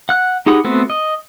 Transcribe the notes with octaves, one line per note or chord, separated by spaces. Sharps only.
F#5 F#6
D#4 G4 G#4 F#5 B5
A3 B3 C4 F#4
D#5